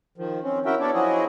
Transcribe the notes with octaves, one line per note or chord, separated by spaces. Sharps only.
D#3 F3
C4 C#4
C#4 E4 F#4 A#4 E5 G5
B3 D4 A4 C#5 D5
F3 F#3 E4 F#4 G#4 D#5